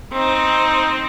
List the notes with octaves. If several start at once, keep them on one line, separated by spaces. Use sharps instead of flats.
C4 D#4